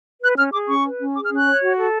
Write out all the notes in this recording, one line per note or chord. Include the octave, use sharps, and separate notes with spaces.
B4 F#6
C#4 F6
G#4 D6
C#4 C#6
B4
C#4
G#4 D6
F6
C#4
F#6
C#5
F#4
A4